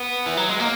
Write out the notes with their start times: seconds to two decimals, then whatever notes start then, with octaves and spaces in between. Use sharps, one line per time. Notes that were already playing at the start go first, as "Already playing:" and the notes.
Already playing: B3
0.26 E3
0.37 F#3
0.49 G#3
0.59 A#3